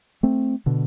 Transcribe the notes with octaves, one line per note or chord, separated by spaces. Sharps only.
A3 C4
B2 D3